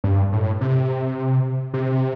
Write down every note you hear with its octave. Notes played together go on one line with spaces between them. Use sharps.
G2
A2
C3
C3